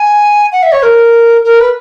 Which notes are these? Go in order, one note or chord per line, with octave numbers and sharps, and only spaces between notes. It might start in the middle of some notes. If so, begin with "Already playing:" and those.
Already playing: G#5
F#5
E5
C#5
A#4
A#4
B4